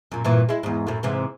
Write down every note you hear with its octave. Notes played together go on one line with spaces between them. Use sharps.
F#2 A#2
G2 A#2 E3
G#3 E4
E2 G#2
F#2 A2
G#2 C3 E3